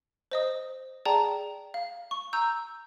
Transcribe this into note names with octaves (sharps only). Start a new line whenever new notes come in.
C5 D#5 D#6
G#4 D5 G5 A5 A#5
F5
C#6
A#5 E6 G6